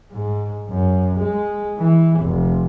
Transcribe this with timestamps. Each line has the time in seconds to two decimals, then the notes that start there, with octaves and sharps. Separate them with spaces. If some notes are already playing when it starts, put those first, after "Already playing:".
0.11 G#2
0.69 F#2
1.17 G#3
1.78 E3
2.20 F1